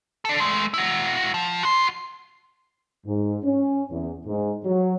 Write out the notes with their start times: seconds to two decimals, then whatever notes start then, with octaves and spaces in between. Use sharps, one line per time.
0.25 D4 A4
0.40 G#3 A3
0.74 E4 F#4
1.34 F3
1.63 F#4 C6
3.06 G#2
3.44 C#4
3.91 E2
4.25 G#2
4.65 F#3